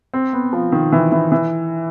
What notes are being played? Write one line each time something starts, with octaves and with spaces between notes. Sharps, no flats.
C4
B3
F3
D#3
E3
E3
E3